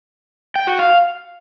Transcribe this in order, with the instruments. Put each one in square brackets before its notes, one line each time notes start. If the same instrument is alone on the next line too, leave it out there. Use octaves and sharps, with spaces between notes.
[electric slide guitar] G5
F#4
F5